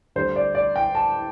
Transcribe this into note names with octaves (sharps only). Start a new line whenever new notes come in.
D2 D3 G3 C5
D5
D5
G5
A5